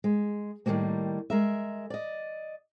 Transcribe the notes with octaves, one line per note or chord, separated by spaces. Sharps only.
G#3
A2 D#3 E3 G3 G#3 A#3
G#3 A#4 E5
D5 D#5